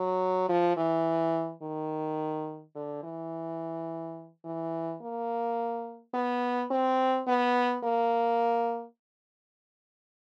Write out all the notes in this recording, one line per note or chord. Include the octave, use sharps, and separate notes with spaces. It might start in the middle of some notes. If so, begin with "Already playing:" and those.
Already playing: F#3
F3
E3
D#3
D3
E3
E3
A#3
B3
C4
B3
A#3